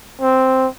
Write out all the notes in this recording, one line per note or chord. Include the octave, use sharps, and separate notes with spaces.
C4